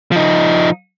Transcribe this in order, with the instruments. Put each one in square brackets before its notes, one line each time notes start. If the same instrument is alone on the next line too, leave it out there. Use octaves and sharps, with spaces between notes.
[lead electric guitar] F3 D#4